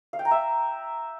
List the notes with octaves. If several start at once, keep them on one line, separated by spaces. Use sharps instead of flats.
F5
G5
A#5
E5